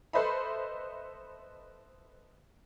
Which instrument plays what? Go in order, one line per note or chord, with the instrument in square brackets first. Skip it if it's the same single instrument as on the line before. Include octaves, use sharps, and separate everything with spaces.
[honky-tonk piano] A4 B4 C5 D#5 E5 B5